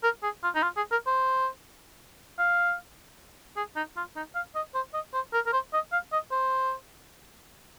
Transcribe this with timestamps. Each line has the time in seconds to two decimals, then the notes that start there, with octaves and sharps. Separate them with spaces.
0.03 A#4
0.23 G#4
0.43 F4
0.55 D#4
0.63 F4
0.76 G#4
0.92 A#4
1.07 C5
2.38 F5
3.56 G#4
3.76 D#4
3.96 F4
4.16 D#4
4.35 F5
4.55 D#5
4.74 C5
4.94 D#5
5.14 C5
5.33 A#4
5.46 A#4
5.53 C5
5.73 D#5
5.92 F5
6.12 D#5
6.31 C5